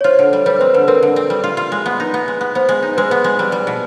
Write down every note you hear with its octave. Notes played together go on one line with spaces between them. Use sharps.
C#5
F4 C5
D3
G3
G3 B4
C4 C5
D3 B4
B4
C4 A#4
D3
C4
G3
F4
F4
G#3
B3
D#4
B3
G#3
B3
B3 C5
G#3
D#4
G#3 B4
B3
G#3
G3
G3
B2